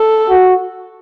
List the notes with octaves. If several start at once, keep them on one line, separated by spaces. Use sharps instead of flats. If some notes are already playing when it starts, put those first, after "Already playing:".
Already playing: A4
F#4